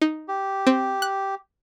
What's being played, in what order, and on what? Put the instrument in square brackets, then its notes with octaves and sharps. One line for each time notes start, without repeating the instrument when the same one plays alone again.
[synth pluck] D#4
[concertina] G4
[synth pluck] C4
F#6